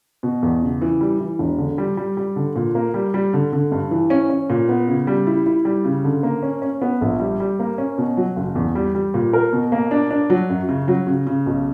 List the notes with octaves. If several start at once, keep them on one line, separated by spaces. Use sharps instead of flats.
B2
E2
C#3
E3
G3
E3
E1
D3
G3
G3
G3
D3
A#2
A#3
G3
G3
D3
D3
G2
E3
C#4
C#4
A#2
B3
C#3
G3
E4
E4
G3
C#3
D3
A#3
C#4
C#4
B3
A#1
G3
G3
A#3
C#4
B2
F#3
F#1
E2
G3
G3
A#2
A#4
B2
A#3
D4
D4
F#3
F#2
C#3
F#3
C#3
C#3
B1